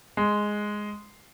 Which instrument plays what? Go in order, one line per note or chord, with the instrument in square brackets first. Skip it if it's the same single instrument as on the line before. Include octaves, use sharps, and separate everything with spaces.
[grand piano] G#3